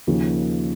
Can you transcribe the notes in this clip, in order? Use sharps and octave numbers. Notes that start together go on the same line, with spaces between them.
D#2 C#3 F3 A#3 C#4